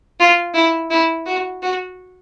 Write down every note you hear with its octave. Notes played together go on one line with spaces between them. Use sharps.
F4
E4
E4
F#4
F#4